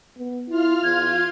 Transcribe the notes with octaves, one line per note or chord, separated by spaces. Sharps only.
B3
E4 F4 F6
E2 G#6